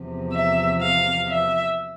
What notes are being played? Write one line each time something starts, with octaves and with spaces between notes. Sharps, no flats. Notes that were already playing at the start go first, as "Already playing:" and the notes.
Already playing: E2 C3 F3
E5
F5
E5